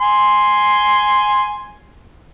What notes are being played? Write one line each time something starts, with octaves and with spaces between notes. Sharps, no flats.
G#5 C6